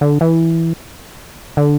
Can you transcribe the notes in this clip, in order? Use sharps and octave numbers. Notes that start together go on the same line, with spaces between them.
D3
E3
D3